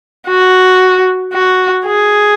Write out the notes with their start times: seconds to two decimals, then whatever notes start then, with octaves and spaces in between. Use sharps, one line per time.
0.28 F#4
1.33 F#4
1.86 G#4